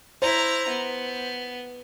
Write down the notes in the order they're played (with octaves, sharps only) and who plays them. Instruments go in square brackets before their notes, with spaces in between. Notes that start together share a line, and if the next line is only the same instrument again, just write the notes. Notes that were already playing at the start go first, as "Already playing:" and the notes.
[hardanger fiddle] E4 A#5 [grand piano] C5
[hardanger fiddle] B3